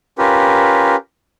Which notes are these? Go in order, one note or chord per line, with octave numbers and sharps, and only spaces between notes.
C#4 F4 G4 A#4 B4